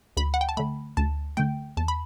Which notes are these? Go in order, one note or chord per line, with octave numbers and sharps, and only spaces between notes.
D2 B5
F#5
G5
A5
D3 A3 B5
D2 A5
D3 A3 G5
E2 A5
B5